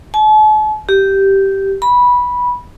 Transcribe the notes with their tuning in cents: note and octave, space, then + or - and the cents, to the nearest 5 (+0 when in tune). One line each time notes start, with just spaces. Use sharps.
A5 -45
G4 -10
B5 -10